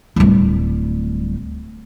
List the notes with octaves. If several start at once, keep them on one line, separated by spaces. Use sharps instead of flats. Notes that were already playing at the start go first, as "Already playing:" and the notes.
D1 G3